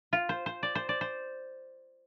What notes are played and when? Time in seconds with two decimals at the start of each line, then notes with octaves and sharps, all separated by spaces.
0.13 F4
0.29 C5
0.46 C5
0.63 D5
0.75 C5
0.89 D5
1.01 C5